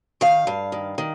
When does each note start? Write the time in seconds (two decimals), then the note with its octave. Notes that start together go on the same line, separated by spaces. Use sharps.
0.21 D#3 F5
0.47 G2
0.72 D#3
0.98 D#3